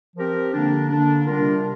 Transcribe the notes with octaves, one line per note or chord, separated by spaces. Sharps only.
F3 C4 G4 A#4
D3 A#3 D4
D3 A#3 D4
C3 G3 D4 F4 A#4